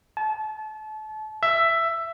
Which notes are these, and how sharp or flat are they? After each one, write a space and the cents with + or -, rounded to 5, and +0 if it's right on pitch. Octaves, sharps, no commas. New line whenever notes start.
A5 -30
E5 +10